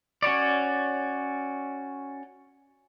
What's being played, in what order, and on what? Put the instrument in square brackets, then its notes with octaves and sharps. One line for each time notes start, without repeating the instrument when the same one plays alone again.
[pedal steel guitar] C#4 F#4 C#5 D5